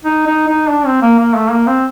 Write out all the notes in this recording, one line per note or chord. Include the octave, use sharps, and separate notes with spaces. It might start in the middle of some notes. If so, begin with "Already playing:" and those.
D#4
D#4
D#4
D4
C4
A#3
A#3
A3
A#3
C4